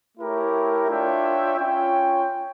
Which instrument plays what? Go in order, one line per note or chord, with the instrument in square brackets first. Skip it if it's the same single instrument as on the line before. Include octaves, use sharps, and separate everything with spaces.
[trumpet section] A3 E4 G4 A#4 C#5
D4 F4 C#5 E5 G5
C#4 F4 C#5 G5